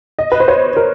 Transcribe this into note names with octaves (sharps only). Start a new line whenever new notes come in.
D#5
B4
C5
C#5
A#4